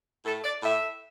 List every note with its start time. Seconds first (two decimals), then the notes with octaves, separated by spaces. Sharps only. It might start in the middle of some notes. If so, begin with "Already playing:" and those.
0.24 A2 A3 A4
0.43 D5
0.62 A2 A3 E5